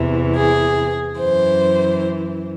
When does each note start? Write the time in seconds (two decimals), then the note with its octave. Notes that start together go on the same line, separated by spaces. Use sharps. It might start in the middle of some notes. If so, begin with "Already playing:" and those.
Already playing: E2 C3 E3
0.35 G#4
1.18 F#2 E3 C5